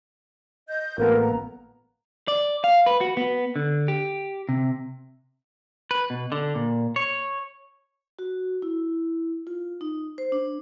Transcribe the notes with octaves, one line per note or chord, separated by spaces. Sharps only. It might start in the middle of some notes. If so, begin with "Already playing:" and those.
D#5 G6
A1 A#3 B3 F4 A4 A#4
A#5
D5
F5
B4
F#4
B3
D3
G4
C3
B4
B2
D3
A#2
C#5
F#4
E4
F4
D#4
C5
D4